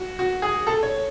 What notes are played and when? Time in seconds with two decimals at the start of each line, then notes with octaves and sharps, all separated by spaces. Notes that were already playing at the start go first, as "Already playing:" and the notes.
Already playing: F#4
0.19 F#4
0.42 G#4
0.67 A4
0.83 C#5